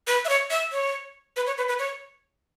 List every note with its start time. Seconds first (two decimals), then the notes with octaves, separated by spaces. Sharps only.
0.07 B4
0.25 E5
0.29 C#5
0.51 E5
0.72 C#5
1.36 B4
1.47 C#5
1.58 B4
1.68 B4
1.79 C#5